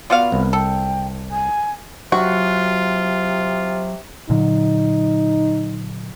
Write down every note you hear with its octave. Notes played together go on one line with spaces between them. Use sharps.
B3 F4 F#4 D5 F5
C2
A4 G5
G#5
C3 F#3 F4 F#4
A#2 D3 F#3 D#4